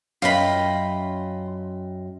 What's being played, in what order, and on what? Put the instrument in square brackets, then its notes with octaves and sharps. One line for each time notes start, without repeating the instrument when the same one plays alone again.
[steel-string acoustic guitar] F#2 D#5 G5 [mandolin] F4 B5